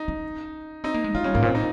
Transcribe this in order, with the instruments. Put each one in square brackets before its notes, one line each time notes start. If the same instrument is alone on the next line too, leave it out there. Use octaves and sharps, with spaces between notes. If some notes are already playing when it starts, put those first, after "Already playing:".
Already playing: [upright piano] D#4
[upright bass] C#4
[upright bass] C4 [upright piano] D#4
[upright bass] A#3
G#3
[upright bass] G#3 [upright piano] F4
[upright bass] G3 [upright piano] C#4
[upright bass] G#2 [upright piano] A#3
[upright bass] A#2
[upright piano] C4
D#4